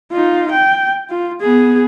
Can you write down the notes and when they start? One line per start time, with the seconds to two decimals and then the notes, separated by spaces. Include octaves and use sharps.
0.12 D#4 F4
0.52 G5
1.10 F4
1.41 B3 G#4